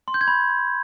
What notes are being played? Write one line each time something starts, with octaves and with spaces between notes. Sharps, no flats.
C6
G6
G#6
B5